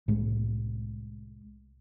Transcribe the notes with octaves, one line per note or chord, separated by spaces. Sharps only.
C2 A2 G#3